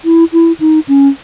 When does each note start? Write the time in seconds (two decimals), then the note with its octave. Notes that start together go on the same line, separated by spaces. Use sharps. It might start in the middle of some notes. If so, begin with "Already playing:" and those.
0.05 E4
0.33 E4
0.60 D#4
0.88 C#4